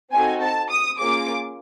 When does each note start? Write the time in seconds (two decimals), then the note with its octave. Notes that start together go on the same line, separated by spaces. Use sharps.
0.12 C4 D#4 F#4 A4 G#5
0.41 A5
0.70 D#6
0.98 A#3 C#4 F4 G#4 D6